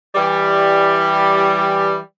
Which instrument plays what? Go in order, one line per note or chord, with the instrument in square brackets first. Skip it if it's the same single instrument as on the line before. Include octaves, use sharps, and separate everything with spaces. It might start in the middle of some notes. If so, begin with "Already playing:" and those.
[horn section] E3 G3